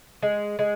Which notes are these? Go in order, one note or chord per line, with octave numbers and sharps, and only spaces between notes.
G#3
G#3